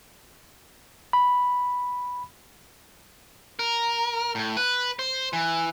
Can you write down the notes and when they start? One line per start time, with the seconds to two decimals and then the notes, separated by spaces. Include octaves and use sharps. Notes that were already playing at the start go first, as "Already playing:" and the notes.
1.13 B5
3.59 A#4
4.35 A2
4.57 B4
4.99 C5
5.33 E3